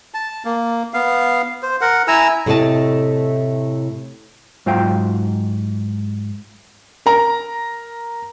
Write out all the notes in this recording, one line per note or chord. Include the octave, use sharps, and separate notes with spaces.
A5
A#3
B3 F5
C5
A#4 F#5
E4 G#5 A#5 E6
A2 C3 A3 E4 D#5 A5
G#2 F#3 F4 C5 F5 G5
A#4 A#5